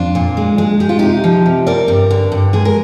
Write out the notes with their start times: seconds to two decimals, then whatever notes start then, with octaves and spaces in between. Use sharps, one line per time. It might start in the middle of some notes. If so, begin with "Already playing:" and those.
Already playing: F2 D4 F4
0.15 A#2
0.37 G#3
0.58 G#3
0.80 G#3 G4
0.89 F4
0.99 C3 D#4 G4
1.24 F3
1.46 C3
1.67 G3 A#4 D5
1.88 G2
2.11 D3
2.32 G2
2.53 G#3 G#4
2.65 A#4